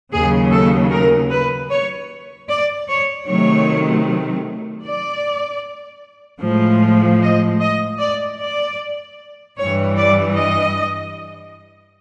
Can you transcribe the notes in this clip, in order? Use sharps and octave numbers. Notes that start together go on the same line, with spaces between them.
D#2 C#3 F#3 G#4
A4
A#4
B4
C#5
D5
C#5
C3 D#3 F#3 A3 C#5
D5
A2 F3 G#3
D#5
D#5
D5
D5
G2 E3 G3 C#5
D5
D#5